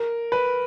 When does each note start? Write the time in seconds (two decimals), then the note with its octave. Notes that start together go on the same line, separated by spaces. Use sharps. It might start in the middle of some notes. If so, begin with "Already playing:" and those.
Already playing: A#4
0.32 B4